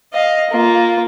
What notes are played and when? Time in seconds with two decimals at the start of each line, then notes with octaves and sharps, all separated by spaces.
0.13 D#5 F5
0.51 A#3 F4